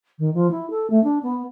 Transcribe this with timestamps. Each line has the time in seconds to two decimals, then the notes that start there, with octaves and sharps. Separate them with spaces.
0.19 D#3
0.34 F3
0.51 E4
0.70 A4
0.90 A3
1.04 D4
1.23 B3